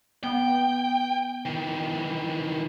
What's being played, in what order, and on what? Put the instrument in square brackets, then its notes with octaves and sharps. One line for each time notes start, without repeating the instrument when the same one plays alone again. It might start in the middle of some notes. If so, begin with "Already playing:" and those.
[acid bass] B3 [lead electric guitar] G5
[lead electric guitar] D#3 E3